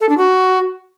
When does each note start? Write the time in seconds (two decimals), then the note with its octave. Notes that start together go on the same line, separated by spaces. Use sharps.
0.01 A4
0.09 D4
0.18 F#4